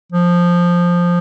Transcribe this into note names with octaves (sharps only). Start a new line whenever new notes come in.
F3